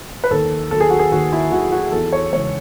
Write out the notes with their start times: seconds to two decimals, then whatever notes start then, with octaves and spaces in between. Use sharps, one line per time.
0.24 B4
0.31 D#2 A4
0.71 D#3 F#3 A4
0.81 G#4
0.90 F#4
0.99 G#4
1.12 D#2 F#4
1.32 E4
1.52 D#3 F#3 F#4
1.72 F#4
1.92 E2 A4
2.13 C#5
2.32 C#3 E3 G#3 C#5